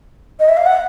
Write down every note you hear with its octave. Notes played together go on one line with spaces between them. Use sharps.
D#5
E5
F5
F#5